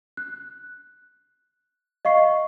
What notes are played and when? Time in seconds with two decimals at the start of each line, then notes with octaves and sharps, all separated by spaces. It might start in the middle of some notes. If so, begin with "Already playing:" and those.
0.17 F#6
2.05 D#5 F5 C#6 C7